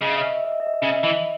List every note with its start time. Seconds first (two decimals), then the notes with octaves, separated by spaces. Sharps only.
0.01 C#3 D#5
0.08 E5
0.16 D#5
0.24 E5
0.31 D#5
0.37 E5
0.44 D#5
0.52 E5
0.60 D#5
0.67 E5
0.74 D#5
0.82 C#3 E5
0.89 D#5
0.96 E5
1.03 E3 D#5